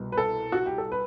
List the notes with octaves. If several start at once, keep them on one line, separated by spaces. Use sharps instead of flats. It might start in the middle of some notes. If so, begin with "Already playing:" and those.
Already playing: C2 B2
B4
A4
F#4
G4
A4
B4